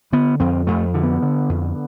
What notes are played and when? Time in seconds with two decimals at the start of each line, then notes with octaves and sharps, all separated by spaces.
0.12 D3 B3
0.40 F2 C4
0.67 F2 A3
0.94 D3
1.03 B3
1.22 D3
1.49 F2